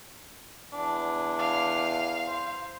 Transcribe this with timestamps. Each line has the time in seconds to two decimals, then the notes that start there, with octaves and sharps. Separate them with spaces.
0.73 E2 D4
1.38 F5
2.27 C5